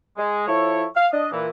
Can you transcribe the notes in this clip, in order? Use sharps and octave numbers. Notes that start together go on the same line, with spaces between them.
G#3
F3 E4 A4 C#5
F5
D4 D#5
A#2 E3